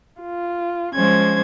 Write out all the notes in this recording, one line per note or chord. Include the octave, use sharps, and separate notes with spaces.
F4
F3 G#3 C#4 C5 G#6